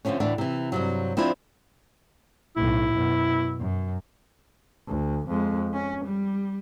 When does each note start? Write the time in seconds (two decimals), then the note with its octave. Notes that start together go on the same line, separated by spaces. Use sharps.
0.05 D3 F3 A3 C4 C#4
0.20 D2 A2 E3 D4
0.38 C3 E3
0.72 G2 C3 F#3
1.17 F3 C4 D4 E4 F4
2.56 B1 A2 E4
2.94 F#2 B2
3.60 F#2
4.88 D2
5.28 F2 G#3
5.73 C#4
6.05 G3